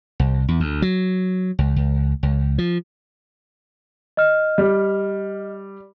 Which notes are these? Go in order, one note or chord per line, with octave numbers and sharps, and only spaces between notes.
C2
E2
D2
F#3
C#2
C#2
C#2
F3
D#5 F6
G3